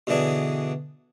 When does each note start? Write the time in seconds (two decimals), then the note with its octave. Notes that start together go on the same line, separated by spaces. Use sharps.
0.07 B2 D3 E3 D4 G#4